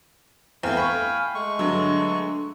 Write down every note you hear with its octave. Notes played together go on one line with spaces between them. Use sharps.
E2 A3 F5 G5 G#5
B5 C#6
G#3 A3 C#6
G2 D3 F#3